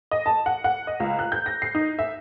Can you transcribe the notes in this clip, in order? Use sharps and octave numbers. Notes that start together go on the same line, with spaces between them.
D#5
A5
F#5
F#5
D#5
C#2
F#6
G6
A#6
C7
D#4
E5